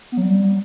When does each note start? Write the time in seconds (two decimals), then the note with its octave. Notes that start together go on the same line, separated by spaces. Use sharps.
0.12 B3
0.17 F#3
0.23 G3